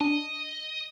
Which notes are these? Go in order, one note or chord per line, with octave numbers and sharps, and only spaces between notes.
D4 D#5